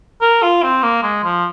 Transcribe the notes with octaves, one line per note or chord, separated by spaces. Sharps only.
A#4
F4
C4
A#3
G#3
F3